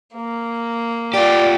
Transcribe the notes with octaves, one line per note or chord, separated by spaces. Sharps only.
A#3
F4 G4 D5